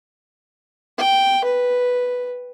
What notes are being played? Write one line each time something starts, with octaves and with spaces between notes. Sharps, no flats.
G5
B4